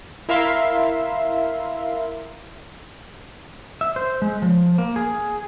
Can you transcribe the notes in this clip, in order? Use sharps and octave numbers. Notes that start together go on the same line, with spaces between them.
E4 A#4 E5 F5 C6
E5
C5
G#3
F3
A#3
G#4